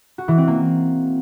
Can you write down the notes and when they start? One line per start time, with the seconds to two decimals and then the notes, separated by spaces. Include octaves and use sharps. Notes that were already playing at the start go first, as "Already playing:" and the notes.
0.18 F#4
0.28 E3
0.38 C4
0.48 A#3